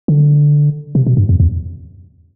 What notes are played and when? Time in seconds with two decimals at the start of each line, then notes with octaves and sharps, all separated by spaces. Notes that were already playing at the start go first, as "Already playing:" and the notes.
0.08 D3
0.95 C3
1.07 B2
1.17 G2
1.29 F2
1.40 E2